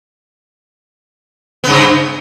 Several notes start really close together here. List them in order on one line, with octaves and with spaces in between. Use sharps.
B3 C#3 G2